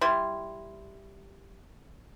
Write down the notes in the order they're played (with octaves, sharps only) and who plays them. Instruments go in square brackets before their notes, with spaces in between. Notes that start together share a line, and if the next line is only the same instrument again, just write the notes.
[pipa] G3 E4 C6